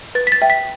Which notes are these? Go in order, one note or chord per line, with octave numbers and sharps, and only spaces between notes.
B4 A6
B6
A6
E5 G5
B6